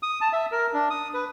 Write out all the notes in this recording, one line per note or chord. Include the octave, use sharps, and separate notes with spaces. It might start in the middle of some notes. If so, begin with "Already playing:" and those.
D#6
A5
E5
A#4
D4
D#6
B4